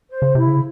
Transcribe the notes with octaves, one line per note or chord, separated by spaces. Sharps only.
C5
C#3
C3 E4
C#3